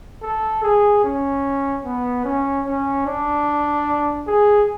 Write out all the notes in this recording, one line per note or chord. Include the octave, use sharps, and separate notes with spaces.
A4
G#4
C#4
B3
C#4
C#4
D4
G#4